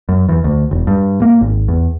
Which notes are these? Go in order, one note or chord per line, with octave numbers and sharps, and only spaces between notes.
F#2
E2
D2
E1
G2
A#3
G#1
E2